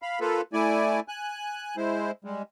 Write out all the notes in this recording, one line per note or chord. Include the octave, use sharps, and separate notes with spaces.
F5 B5
A#3 F4 A4 B4
A3 E4 D5 G#5
G#5 F#6
G#3 E4 C5
G3 G#3